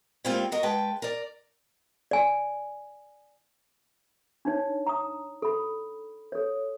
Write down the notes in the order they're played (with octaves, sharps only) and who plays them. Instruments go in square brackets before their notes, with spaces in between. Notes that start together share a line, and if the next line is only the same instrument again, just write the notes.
[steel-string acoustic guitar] G3 G#3 A#3 C4 E4 F4
F#4 A#4 D#5
G#3 B4 G5 A5
A#4 D5
[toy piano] D5 G#5
D4 D#4 C#5
A#5 D#6
A4 B5
A4 C#5